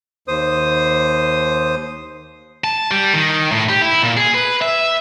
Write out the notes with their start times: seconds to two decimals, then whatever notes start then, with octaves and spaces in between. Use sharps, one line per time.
0.28 D#2 C5 D#6
2.64 A5
2.91 G3
3.13 D#3
3.52 A2
3.69 G4
3.81 E4
4.02 A#2
4.17 G#4
4.34 B4
4.62 E5